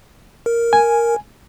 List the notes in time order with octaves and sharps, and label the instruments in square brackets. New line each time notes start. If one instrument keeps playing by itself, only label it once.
[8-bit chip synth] A#4
[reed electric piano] G#5